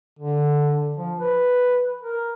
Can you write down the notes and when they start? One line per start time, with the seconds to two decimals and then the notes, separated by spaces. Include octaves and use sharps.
0.19 D3
0.97 F3
1.20 B4
2.01 A#4